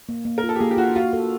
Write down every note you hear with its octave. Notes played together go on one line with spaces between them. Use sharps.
A#3
A#3
A#4
F4
A4
G4
A#3 G#4
G4
F4 F#4
F4 F#4
A4